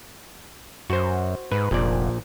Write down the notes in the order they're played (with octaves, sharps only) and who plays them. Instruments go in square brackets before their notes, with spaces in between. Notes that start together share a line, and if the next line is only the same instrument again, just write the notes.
[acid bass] F#2 [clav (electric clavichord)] F#4 C5
[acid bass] G#2 [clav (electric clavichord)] B4
[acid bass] F1 [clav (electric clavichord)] A#1 A#2 D5